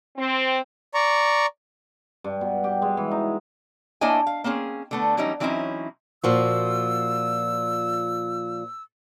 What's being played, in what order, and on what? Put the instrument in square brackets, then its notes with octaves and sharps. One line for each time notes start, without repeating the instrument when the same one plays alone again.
[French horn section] C4
[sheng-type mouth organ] D5 A#5 C#6
[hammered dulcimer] G2
B2
G4
G#3
E3
D#4
[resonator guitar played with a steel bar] A#3 D4 E4 C#5 D#5 G#5
F5
A#3 C4 C#4 G#4
D3 A3 B3
E3 F#3 G3 C#4 D#4
E3 F#3 C4 C#4 D#4 E4
[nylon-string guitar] A#2 F3 F#4 [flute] E6